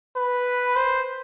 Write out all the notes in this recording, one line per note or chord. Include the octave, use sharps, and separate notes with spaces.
B4
C5